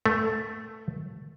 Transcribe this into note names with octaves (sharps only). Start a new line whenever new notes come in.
A3